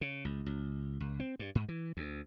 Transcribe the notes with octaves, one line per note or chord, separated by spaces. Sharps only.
C#3
C#2
C#2
C#2
C4
G2
G#2
E3
D2